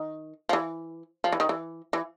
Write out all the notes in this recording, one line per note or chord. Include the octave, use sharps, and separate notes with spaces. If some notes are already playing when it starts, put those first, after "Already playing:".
Already playing: D#3
F3
E3
F3
E3
D#3
E3
E3